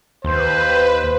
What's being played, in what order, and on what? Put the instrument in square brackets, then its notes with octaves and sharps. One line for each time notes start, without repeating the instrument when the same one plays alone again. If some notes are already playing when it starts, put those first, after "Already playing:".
[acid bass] D#2 [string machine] B4 [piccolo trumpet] C5